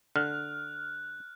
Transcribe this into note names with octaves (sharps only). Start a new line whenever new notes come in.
D3 F6 F#6